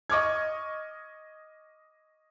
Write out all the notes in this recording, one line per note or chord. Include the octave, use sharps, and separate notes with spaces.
D#5 C#6 D6 F6 G#6